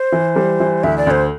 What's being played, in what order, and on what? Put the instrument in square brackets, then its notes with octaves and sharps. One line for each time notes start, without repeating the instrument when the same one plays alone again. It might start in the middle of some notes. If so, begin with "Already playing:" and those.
Already playing: [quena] C5
[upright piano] E3
G3
E3
[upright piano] D2 [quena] E5
[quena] D5
[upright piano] D2 [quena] C5